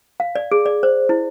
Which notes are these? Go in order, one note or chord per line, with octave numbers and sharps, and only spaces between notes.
F5
D5
G#4
D5
C5
E4